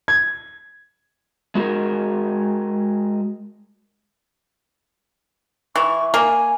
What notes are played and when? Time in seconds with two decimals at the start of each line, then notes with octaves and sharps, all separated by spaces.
0.08 G#6
1.55 G#3 F#4 G#4 A#4
5.76 E3 C#6
6.14 A#3 G#5